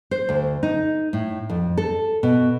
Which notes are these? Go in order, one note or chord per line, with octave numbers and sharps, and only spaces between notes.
C5
D2
D#4
A2
F2
A4
B2